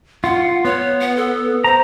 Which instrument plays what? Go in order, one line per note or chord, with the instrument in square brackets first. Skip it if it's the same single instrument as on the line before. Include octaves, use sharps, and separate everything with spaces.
[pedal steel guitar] F4 [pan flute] F#5
[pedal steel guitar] B3 [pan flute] C#5
[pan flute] F#5
A4
[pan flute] C5 [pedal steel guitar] A#5